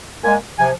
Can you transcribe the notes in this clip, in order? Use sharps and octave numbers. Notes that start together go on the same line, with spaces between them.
A#2 G#3 G#5
C3 F3 G#5